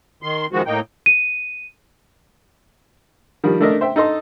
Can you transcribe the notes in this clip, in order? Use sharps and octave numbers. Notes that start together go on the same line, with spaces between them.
D#3 C6
D#3 F3 G#3 F#4
A2 A#3 D#4 G5
D#7
D#3 F3 G3
D#3 A3 D4 A4 A#4 D#5
C5 E5 G5
D#4 A4 D#5 C6